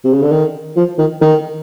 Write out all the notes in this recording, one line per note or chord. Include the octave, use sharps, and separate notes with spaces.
C3
C#3
D3
D#3
F3
D#3
D#3